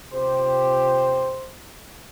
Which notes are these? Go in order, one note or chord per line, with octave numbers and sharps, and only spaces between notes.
C3 F4 G4 C5